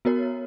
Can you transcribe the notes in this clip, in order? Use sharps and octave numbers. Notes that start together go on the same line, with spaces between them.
B3 F#4 A#4 C#5